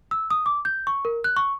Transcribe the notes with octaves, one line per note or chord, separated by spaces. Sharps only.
E6
D#6
D6
G6
C#6
A#4
F#6
C#6